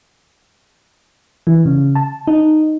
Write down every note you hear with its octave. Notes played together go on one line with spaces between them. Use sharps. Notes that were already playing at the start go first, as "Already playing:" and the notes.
E3
C#3
A5
D#4